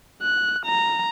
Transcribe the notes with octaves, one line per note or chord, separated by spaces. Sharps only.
F#6
A#5